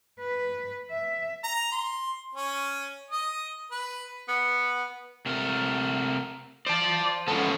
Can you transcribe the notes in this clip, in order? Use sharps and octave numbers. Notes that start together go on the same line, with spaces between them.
B4
E5
A#5
C6
C#4
D#5
B4
B3
C3 A3 A#4
C5 D5 A5
F3 G#3 B3 C#4 A4